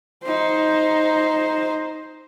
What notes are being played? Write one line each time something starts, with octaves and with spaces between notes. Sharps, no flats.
D#4 C5